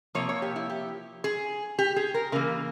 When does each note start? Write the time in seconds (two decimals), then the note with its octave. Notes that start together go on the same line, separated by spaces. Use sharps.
0.15 C3 F3 A#3 C#5
0.29 C#5
0.42 G4
0.56 E4
0.70 G4
1.24 G#4
1.79 G4
1.96 G#4
2.14 A#4
2.32 C#3 E3 A#3 A#4